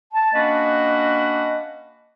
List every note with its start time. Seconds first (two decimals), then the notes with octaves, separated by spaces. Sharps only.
0.14 A5
0.33 A#3 C#4 D4 F#4 B4 D#5